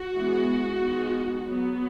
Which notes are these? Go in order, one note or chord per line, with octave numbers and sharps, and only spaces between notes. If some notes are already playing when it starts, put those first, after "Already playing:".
Already playing: F#4
E3 G#3 B3
D#3 G#3 B3
F#3 B3